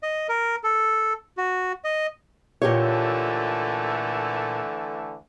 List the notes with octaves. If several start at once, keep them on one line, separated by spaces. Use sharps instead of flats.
D#5
A#4
A4
F#4
D#5
A#2 D3 E3 A3 G4 C#5